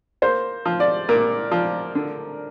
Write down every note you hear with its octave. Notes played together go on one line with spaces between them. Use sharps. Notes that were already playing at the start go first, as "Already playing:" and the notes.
A#3 C5
F3
D5
A#2 A#4
F3
D3